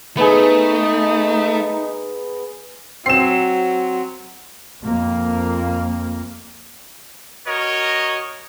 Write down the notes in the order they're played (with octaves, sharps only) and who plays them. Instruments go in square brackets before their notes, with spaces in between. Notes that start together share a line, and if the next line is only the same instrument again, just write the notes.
[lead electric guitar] A3 [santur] B3 G#4 [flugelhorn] D#4
[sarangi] F#3 [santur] C4 [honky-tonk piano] C7 E7
[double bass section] F2 A#3
[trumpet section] F#4 A#4 C#5 D#5